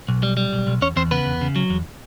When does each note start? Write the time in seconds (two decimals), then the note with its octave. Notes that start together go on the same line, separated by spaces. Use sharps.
0.08 B1
0.23 G3
0.37 G3
0.53 B1
0.67 B1
0.81 E2 C#4 C#5
0.96 E2 C4 C5
1.11 C#3 B3 B4
1.26 E2
1.41 C#3
1.56 F#3
1.70 E2